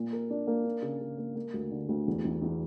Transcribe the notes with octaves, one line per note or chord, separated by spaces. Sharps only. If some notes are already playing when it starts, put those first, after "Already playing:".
Already playing: A#2
A#4
D4
A#3
D4
C#3
C#3
A#3
A#3
D2
D3
D2
E2
E2
E2